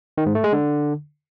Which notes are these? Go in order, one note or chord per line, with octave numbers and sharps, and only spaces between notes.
D#3
G#2
A3
G#3
D3